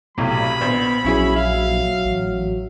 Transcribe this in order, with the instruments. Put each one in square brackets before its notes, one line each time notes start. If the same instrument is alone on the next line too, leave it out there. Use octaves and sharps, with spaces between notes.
[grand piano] B1 A2 C3 [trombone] F#3 [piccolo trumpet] B5
[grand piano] A#1 C5 [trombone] B3
[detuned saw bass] A#1 [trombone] F#3 [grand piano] C#4 E4 G#4
[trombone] F#3 [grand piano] E5 [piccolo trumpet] F5
[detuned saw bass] A1